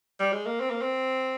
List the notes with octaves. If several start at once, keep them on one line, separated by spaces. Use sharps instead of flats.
G3
G#3
A#3
C4
A#3
C4